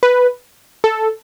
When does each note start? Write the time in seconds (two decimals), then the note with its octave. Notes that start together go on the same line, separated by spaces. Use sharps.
0.03 B4
0.84 A4